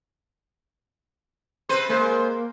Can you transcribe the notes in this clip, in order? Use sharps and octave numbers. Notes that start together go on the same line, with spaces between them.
C3 B4 C5
G#3 A#3 C5